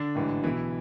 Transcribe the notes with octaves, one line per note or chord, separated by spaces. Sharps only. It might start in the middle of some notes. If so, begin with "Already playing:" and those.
Already playing: D3 D4
A1 G#2 E3
B1 B2 E3 E4